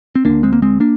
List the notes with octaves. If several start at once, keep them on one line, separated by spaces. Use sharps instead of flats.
C4
D2 D3 A#3 D4
G#3 C4
A#3
G#3 C4
A#3 D4